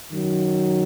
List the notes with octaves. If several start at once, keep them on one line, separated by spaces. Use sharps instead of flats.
F#2 D#3 F#3